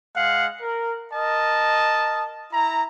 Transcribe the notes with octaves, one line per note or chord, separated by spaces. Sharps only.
G#3 F5 F#5
A#4
A#4 D#5 A5
E4 A#5